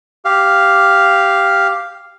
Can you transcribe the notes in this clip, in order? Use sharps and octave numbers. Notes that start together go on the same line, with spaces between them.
G4 F5